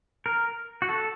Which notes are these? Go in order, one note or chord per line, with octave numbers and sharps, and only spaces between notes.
A#4
F#4
A4